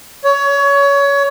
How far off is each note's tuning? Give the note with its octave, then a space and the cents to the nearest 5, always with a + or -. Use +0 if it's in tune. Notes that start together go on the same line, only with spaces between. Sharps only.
C#5 +25